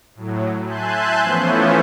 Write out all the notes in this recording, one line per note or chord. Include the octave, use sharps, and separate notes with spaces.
A2 F#3
E5 G#5 A5 C6 F#6 G6
E3 F3 A3 B3 C#4 C5